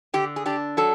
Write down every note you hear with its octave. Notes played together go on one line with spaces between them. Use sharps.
D3 G4
G#4
D4 G4
F#3 A4